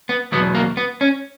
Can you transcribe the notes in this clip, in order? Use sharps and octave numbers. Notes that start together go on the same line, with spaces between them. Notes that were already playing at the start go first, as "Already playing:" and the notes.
B3
E2 B2 F#3 B3
A#3
B3
C#4